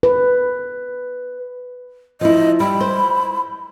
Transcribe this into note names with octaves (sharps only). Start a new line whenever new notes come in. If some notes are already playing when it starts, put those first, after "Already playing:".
B4
F3 E4 D#5
G3 B5
C5